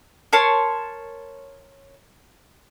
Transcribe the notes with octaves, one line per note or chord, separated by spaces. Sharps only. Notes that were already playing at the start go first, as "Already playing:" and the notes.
A#4 C#5 A5 C6